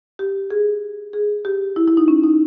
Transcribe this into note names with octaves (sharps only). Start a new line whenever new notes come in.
G4
G#4
G#4
G4
E4
E4
D#4
C#4
D#4